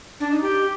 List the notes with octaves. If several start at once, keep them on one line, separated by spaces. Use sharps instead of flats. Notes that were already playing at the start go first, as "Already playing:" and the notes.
D4
D#4
G4